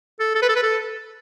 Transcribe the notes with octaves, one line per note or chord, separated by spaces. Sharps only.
A4
A4
B4
A4
B4
A4